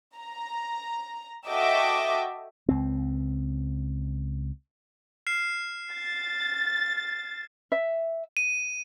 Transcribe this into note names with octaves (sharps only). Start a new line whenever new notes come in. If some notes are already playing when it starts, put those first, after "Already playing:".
A#5
F#4 A4 D#5 E5 G5 D6
C#2 C4
F6 C7 E7
A6
E5
D#7